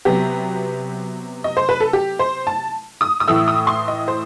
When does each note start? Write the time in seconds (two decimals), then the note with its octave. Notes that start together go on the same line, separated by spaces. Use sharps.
0.05 C3 F#3 B3 G4
1.44 D#5
1.57 C5
1.69 B4
1.80 A4
1.93 G4
2.19 C5
2.47 A5
3.01 D#6
3.20 D#6
3.28 A2 E3 A3 E6
3.48 D#6
3.67 C6
3.88 D#5
4.08 C5